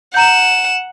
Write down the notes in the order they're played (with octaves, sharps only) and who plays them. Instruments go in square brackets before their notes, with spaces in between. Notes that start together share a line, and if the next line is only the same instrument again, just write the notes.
[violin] F#5 E7 [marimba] A#5 G6